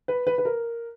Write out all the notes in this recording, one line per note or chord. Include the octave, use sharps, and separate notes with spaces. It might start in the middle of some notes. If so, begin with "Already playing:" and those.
B4
B4
B4
A#4